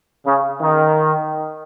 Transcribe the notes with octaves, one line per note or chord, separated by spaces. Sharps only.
C#3
D#3